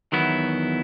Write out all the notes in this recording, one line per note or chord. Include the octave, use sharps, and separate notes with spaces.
E2 D#3 F#3 B3 E4